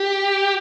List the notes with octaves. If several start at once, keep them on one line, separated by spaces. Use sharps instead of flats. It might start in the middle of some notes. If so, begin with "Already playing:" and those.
Already playing: G4